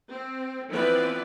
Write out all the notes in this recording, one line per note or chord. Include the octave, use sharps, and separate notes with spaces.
C4
E3 F3 B3 C4 B4 D5